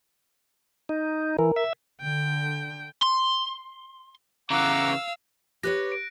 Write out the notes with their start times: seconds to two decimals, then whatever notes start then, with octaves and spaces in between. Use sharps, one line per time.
0.89 D#4
1.39 E3 A#4
1.56 E5
2.01 D3 G5
3.03 C6
4.50 C#3 E3 F5 F#5 A#5 D6 E6
5.63 G4 B4 C#5 F#6 A#6
5.92 D7